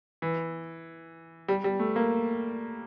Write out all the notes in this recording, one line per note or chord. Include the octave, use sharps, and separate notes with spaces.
E3
G3
G3
A3
A#3